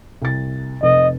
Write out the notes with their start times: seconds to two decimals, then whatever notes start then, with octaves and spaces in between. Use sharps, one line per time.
0.22 C2 A6
0.83 F1 D#5